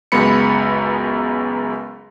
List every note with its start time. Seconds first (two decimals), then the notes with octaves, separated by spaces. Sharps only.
0.12 C#2 F#2 G#3 B3 B5 C#7